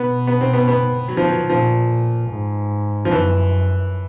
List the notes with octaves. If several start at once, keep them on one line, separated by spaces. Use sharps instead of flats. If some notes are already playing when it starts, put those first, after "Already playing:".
Already playing: B2 B3
B3
C4
B3
B3
F#3
F3
F#3
A#2 F3
G#2
F3
F#2 E3